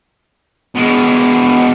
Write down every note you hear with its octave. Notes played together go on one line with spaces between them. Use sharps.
B2 G#3